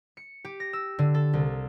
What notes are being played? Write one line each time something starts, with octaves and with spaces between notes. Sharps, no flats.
C#7
G4
A#6
E6
D3
A4
C2